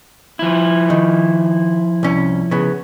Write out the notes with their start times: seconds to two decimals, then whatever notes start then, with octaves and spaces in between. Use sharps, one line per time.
0.39 F3 E4
0.90 D#3
2.03 C2 C#4
2.51 C#3 B3